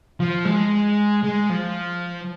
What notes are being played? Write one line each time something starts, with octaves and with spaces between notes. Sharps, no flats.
F3
G#3
G#3
F3